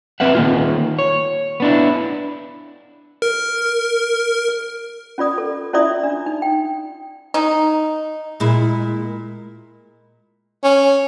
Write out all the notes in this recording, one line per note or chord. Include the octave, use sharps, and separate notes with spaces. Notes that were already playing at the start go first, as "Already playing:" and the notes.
C4 B4 E5 F#5
D#3 A#3 F4
C#5
B3 D4 E4
A#4
C#4 F4 D5 D#6
A4
C#4 E4 F4 D5 E5 D#6
D4
D#4
G5
D#4
A#2 G#3 E4
C#4